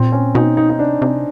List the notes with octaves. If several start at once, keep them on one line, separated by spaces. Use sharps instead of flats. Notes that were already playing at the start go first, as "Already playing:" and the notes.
Already playing: A#2 C4
C#4
B2 D#4
D#4
D#4
C3 D4
C3